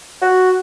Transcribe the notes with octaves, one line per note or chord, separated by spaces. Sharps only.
F#4